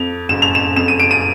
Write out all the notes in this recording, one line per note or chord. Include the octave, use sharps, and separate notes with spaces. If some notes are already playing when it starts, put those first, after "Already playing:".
Already playing: F2 F7
F#1 E7
F7
E7
F2 E7
D#7
D7
D#7